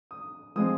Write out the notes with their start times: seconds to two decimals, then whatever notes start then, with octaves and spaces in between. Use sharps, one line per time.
0.11 D#6
0.56 F3 G#3 C4 D#6